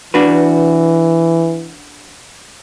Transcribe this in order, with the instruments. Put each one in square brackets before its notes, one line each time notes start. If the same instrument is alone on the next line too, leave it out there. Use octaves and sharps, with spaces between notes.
[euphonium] E3 [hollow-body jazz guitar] D4 F#4 B4